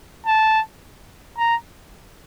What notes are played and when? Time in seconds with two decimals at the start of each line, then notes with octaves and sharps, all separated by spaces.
0.26 A5
1.38 A#5